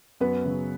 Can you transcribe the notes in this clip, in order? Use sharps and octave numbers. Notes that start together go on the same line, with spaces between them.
F#2 B3 B4
C#3 F#3